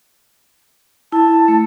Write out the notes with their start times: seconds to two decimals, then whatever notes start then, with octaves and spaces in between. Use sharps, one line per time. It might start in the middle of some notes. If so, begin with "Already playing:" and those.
1.12 E4 A5
1.48 A3